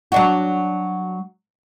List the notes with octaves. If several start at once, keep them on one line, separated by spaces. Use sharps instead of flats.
F#3 D4 F#4